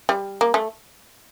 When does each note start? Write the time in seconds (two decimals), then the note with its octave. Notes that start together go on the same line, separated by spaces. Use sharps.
0.09 G3
0.41 A#3
0.54 A3